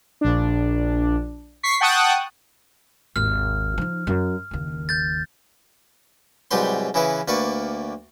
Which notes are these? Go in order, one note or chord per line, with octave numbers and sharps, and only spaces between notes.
A#1 D4
C#6 B6 C7
F#5 G5 A5 C#6 D#6 F#6
G#1 D#2 F6
F3 D#4
F#2
F#1 D#2
G6 A6
C2 G#2 F#3 G4 B4 C6
C#3 E3 E4 G#4 B4
D2 A#3 B4 D5 C#6